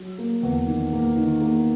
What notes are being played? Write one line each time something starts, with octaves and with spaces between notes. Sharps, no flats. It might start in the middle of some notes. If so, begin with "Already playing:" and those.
Already playing: F#3
A#3
E2
D#3
A#3
D#3
A#3